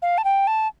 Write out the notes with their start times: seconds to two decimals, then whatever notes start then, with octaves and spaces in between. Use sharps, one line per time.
0.02 F5
0.18 A5
0.24 G5
0.47 A5